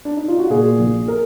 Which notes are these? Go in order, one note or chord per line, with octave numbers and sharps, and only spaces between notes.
D4
D#4
F4
F#4
A#2 G#4
A#1
A#4